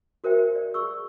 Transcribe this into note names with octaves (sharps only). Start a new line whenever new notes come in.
F#4 A#4 C5 E5 G5
D5
G#4 C#6 E6